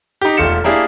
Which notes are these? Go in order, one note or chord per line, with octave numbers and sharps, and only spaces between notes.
D#4 G4
E1 A3 F4 C#7 E7
A#3 D4 E4 G4 G#4